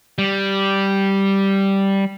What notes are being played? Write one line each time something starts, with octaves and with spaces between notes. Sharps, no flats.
G3